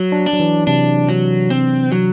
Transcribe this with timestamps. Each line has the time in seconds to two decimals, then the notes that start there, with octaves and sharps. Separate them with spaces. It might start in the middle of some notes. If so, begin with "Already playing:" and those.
Already playing: F#3
0.12 D4
0.26 D4
0.33 F#3
0.40 E3
0.67 C3 D4
1.09 F#3
1.50 C4
1.92 F#3